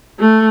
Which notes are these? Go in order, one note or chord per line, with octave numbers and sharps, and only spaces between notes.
A3